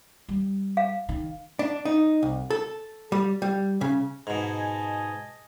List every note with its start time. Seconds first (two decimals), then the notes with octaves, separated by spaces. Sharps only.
0.29 G3
0.77 F5
1.09 D#3
1.59 D4
1.85 D#4
2.23 C2
2.50 A4
3.12 G3
3.42 G3
3.81 C#3
4.27 G#2 B2 D#5 G#5 A5